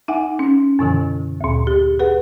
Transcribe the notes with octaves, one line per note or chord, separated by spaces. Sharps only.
D#4 E5 F#5 G#5
C#4
F#2 B2 D3 E3
D2 A#2
G4
G#4 B4 F#5